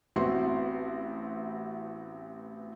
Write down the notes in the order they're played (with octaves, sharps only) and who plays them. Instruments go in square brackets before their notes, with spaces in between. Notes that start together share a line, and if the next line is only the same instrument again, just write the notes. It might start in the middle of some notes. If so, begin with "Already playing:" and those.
[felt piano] A1 B3 C4 E4 F#4 C6